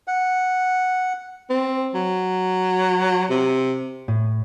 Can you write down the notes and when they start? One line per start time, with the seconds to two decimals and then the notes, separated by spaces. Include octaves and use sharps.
0.08 F#5
1.50 C4
1.95 F#3
3.30 C3
4.08 A2